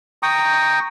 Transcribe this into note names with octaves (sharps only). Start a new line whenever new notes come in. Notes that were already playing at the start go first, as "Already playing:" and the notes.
G5 A#5 C#6 D#6